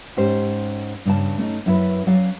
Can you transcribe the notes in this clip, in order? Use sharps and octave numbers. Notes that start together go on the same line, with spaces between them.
G#2 C#4 G4 C5
G2 C#3 A5
A3 C#4 D#4
F#2 E4 B4
F#3 C#4 D5 F5